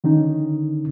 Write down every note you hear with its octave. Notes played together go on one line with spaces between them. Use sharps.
D3 D#3 C#4 D#4